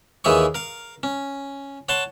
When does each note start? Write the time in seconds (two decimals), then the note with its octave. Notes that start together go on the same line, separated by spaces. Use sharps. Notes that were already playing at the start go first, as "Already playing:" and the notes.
0.24 D#2 E3 E4 G#4 C#5 C#6
0.55 A#4 F5
1.03 C#4
1.89 C#5 F#5 A5 C6